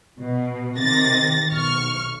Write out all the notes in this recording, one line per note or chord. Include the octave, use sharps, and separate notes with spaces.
B2
C3 D#3 A6 A#6
B1 C#6 F6